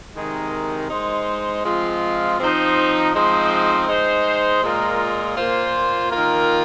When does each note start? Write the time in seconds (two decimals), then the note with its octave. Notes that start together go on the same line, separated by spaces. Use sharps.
0.16 C3 D#3 G#3 D#4 A#4
0.90 G#3 D#4 C5
1.64 F3 G#3 C4 F4
2.39 F3 C4 D#4 C5
3.13 F3 G#3 C4 D#4 C5
3.87 G#3 D#4 C5
4.62 A#2 G#3 F4 A#4
5.36 A#2 A#3 F4 C5
6.10 D#3 A#3 F4 A#4